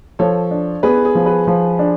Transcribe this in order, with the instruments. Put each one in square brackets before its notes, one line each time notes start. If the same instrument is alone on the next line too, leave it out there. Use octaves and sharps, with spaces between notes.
[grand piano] F3 [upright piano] A4 C#5
[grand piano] D4
[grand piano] B3 [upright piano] G#4 B4
[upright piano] G#4
[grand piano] F3
[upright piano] G#4 B4
[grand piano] F3
D4